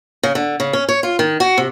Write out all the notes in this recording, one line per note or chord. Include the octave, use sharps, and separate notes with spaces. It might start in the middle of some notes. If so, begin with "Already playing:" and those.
C#3
D3
C#3
C#4
C#5
F4
D#3
F#4
C3